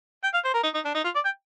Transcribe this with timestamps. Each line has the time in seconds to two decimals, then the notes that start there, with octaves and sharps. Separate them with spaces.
0.24 G5
0.34 F5
0.44 C5
0.54 A#4
0.63 D#4
0.74 D#4
0.85 D4
0.95 D#4
1.04 F4
1.15 D5
1.25 G5